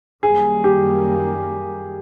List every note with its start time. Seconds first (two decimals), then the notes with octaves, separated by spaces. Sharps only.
0.23 F#2 D#3 G3 A#3 G#4
0.64 G4